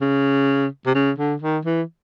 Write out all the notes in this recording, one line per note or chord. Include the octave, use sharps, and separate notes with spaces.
C#3
C3
C#3
D3
D#3
E3